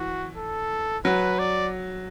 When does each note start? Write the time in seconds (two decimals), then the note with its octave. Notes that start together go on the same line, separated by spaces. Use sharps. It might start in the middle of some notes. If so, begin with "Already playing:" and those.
Already playing: E3 F#4
0.37 A4
1.05 F#3 B4
1.39 D5